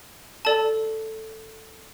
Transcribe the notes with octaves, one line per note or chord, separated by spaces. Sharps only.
A4 D5 A5